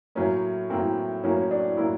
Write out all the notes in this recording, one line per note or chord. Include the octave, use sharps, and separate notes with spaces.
A2 F#3 A#3 C#4
A2 F#3 A#3 C4
A2 F#3 A#3 C#4
C#4
D4
A2 F#3 A#3 E4